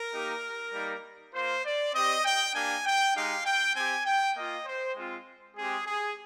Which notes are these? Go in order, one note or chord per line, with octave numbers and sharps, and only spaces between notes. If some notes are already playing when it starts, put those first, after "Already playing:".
Already playing: A#4
A#3 D#4 G4
G3 A#3 D#4
A#3 F4 C5
D5
C4 G4 D#5
G5
A#3 D4 G4 G#5
G5
G#3 D#4 G4 F5
G5
C4 G4 G#5
G5
A#3 F4 D#5
C5
G#3 C4 F4
G#3 C4 G4 G#4
G#4